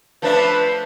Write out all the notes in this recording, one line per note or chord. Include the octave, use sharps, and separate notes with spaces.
F3 A3 D4 B4